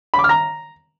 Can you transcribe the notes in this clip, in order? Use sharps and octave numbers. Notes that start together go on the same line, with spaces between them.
B5
D6
F6
A#5